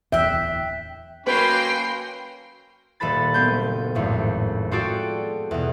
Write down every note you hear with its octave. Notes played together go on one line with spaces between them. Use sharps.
D1 E2 E5 G5 F#6
F#3 A#3 C#4 B4 G5 B5 C6 C7
D#1 A4 B4 B5 A6
F#1 B3 C4 G6
G#1 F2 A2
F4 F#4 G#4 A4 D5 G5
E2 B2